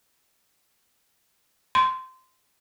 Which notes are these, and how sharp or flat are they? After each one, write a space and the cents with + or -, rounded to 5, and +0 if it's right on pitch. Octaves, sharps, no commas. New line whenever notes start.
C6 -15